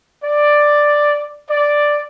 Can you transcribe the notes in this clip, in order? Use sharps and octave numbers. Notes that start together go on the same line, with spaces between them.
D5
D5